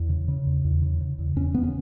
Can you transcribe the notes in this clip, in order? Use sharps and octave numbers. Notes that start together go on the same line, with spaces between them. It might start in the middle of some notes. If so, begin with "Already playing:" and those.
Already playing: E2
C#3
C#3
E2
E2
C#3
C#3
E2
E2 C#4
C#3 B3
C#4